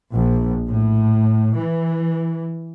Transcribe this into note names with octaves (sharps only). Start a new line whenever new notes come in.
A#1
A2
E3